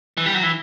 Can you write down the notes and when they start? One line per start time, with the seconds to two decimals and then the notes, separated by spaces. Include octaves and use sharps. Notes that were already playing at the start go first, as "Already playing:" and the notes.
0.17 E3
0.26 G3
0.35 F#3
0.43 E3